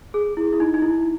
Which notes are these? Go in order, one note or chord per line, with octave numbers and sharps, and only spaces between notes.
G#4
E4
E4
D#4
D#4
E4